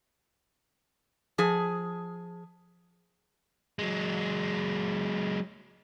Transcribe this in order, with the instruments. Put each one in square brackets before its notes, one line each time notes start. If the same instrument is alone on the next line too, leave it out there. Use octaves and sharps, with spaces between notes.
[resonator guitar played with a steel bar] F3 G#4
[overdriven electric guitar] F#3 G#3